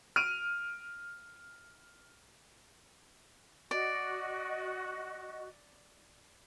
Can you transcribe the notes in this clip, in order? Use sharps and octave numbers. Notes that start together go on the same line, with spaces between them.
F6 D7 D#7
F#4 D5 D#5